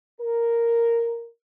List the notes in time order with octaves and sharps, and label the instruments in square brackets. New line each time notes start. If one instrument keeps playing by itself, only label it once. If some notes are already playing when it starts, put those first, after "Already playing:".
[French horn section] A#4